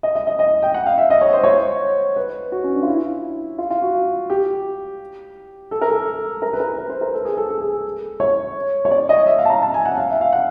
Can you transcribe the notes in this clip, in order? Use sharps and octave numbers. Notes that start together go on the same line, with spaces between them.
D#5
D#5
D#5
D#5
G5
F#5
F5
E5
D#5
C#5
C5
C#5
C5
B4
F#4
C#4
D4
F4
E4
F4
F4
F#4
G4
A4
A#4
A4
A#4
B4
A#4
B4
C5
A#4
A4
G#4
A4
A4
G#4
C#5
C#5
D5
D#5
E5
F5
A5
A#5
A5
G#5
F#5
F5
E5
F5
F#5